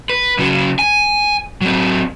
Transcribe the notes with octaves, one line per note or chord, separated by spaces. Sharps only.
B4
C#3 F#3
G#5
F#3 C4